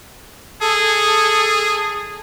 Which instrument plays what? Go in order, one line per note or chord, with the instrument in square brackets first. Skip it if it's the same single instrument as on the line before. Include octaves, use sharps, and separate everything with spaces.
[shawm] G#4 [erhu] A4